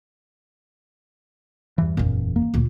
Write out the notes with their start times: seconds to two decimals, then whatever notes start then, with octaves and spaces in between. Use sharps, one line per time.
1.78 E2 G2 E3
1.97 F#1 E2 A#2
2.36 A#3
2.54 D2 A#2